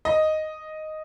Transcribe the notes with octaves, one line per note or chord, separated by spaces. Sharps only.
D#5